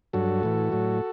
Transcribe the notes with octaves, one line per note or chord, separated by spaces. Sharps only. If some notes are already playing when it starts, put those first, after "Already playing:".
G2 F#3 F#4 A4
A2 E3
A2 F#3